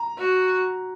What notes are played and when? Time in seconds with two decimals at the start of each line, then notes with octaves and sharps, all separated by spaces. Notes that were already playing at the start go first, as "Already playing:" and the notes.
Already playing: A#5
0.18 F#4